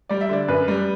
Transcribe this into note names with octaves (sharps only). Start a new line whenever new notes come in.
G3 D5
E5
D3 D5
F#2 B4
G3